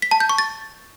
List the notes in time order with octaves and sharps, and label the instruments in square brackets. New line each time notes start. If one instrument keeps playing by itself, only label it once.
[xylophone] B6
A5
G6
C#6
A6